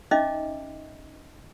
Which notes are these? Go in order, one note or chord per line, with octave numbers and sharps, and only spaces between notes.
C#4 D#4 D#5 E5 D6